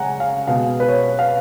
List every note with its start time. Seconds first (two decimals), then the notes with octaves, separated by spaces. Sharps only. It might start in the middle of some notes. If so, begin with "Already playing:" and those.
Already playing: C#3 G#3 C#4 F#5 G#5 A#5
0.20 F5
0.47 B2 G#3 B3 F5
0.80 B4
0.89 C#5
1.19 F5